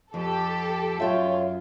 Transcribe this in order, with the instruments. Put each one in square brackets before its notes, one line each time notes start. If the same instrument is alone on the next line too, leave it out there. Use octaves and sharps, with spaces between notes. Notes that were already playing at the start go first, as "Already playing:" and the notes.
[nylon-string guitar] F2 [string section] G4 A4
[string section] F#2 [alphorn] F4 [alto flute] C#5 [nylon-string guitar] E5 G5